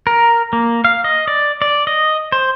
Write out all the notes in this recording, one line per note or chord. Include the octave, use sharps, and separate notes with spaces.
A#4
A#3
F5
D#5
D5
D5
D#5
C5